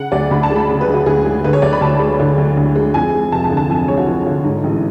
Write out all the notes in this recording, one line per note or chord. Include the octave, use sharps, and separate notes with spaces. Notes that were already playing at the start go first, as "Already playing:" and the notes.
Already playing: C#3 F#5
D2 D5
D2 B5
A5
G#3
B5
C#3
B4
D2
F#4
D2 G#4
G#3
D3 B4
C#5
D2 D5
B5
D2 A5
G#3
D3
D2
D2
G#3
F2 G#5
G#3
F1 A5
A5
D3
A5
F2 G#5
G#3 C#5
F#4
F1 F4
D3
G#2
A1